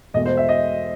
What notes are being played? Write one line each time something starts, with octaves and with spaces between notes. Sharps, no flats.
E1 E2 B2 A3 D#5
C5
E5
D#5